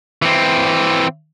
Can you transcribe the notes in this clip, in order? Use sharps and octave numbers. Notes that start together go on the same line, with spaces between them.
E3 C4